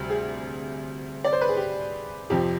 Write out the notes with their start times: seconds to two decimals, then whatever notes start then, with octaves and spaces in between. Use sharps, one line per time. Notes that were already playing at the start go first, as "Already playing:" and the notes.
Already playing: D2 C3 G3
0.10 G#4
1.24 D5
1.33 C5
1.41 B4
1.49 G#4
1.57 G4
2.30 F2 C3 F3 G4